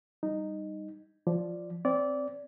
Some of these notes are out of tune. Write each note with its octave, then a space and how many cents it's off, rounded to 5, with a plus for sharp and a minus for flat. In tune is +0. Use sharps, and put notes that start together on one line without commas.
G3 +0 D#4 -10
F3 +0 D5 +0
C4 +0 D5 -20